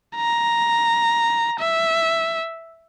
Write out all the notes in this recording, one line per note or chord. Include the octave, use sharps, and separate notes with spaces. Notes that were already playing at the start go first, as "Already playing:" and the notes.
A#5
E5